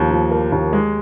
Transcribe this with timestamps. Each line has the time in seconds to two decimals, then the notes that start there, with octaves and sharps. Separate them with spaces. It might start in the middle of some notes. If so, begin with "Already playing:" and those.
Already playing: D#2 F3
0.11 F3
0.31 A#3
0.52 D#2
0.73 G#3